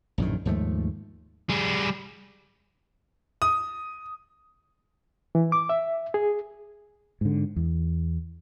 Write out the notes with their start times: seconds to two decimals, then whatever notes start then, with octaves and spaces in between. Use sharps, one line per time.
0.18 A#1 F#2 A2 D#3
0.45 D#2 G#2 F3 A3
1.49 G3 G#4
3.42 D#6
5.35 E3
5.52 D6
5.69 E5
6.14 G#4
7.21 G#2 D3
7.56 E2